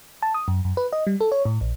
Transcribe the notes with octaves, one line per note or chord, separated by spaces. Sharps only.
A5
D#6
F#2
F#2
B4
D#5
G3
A4
C#5
A2
A#1